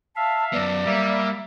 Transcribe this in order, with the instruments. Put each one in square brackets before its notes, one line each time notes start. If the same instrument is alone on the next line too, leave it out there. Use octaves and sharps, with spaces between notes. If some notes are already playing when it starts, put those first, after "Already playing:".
[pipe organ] E5 F5 [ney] A5
[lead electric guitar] F#2 B3 [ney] D5
[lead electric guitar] G3 [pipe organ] A#3 E5